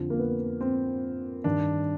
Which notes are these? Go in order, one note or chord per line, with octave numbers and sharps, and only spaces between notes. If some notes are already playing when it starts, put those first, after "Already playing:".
Already playing: F2 D3 F3
A#3
B3
C4
G2 D#3 D4